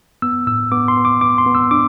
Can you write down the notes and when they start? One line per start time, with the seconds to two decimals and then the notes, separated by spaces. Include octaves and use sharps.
0.22 B3 E6
0.47 A2 E6
0.72 B3 D6
0.88 C6
0.97 B3
1.05 D6
1.21 B3 D6
1.38 C6
1.46 B3
1.55 E6
1.71 D4 D6